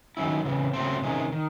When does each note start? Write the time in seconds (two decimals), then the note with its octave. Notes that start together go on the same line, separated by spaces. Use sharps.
0.17 D#3 F#3 C#4 E4
0.45 C#3 E3 C4
0.73 C#3 F#3 A3 C4
1.01 C3 D#3 G#3 C#4
1.32 D#3